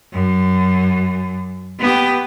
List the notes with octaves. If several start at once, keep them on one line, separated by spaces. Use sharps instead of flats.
F#2
B3 G4